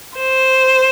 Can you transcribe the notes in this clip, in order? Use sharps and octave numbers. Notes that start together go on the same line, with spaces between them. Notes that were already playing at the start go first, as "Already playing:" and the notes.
C5